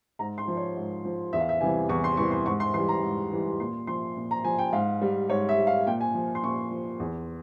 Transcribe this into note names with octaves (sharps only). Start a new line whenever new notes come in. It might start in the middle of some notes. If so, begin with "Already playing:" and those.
G#2 A#5
C6
F3
C#5
G#2
F3
E2 E5
F5
E5
C3 E3 G3 G#5
E2 C#6
C6
C3 E3 G3 C#6
C6
G#2 C#6
C6
E3 G3 C6
A#5
G#2
E3 G3
A#2 C6
F3 C6
A#2
A#5
F3 G#5
G5
G#2 F5
G3
G#2 C#5
E5
G3
F5
A#2 G5
G#5
F3
C6
A#2 C#6
F3
E2